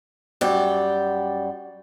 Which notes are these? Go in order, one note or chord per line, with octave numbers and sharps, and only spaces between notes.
F#2 G3 D5 G5